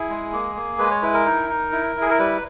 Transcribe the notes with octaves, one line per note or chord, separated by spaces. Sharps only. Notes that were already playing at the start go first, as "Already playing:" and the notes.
Already playing: E4 G#4
G#3
A#3
A#3
G#3 B4
C#5
E4 B4
A#4
D#4
D#4
E4
E4
G#4
A#4
G3 B4